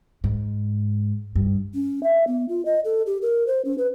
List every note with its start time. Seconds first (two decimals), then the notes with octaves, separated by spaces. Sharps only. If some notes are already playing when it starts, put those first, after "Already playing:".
0.24 G#2
1.36 G2
1.75 C#4
2.03 E5
2.27 B3
2.49 F4
2.65 D#5
2.85 A4
3.06 G4
3.22 A#4
3.47 C5
3.65 C#4
3.78 B4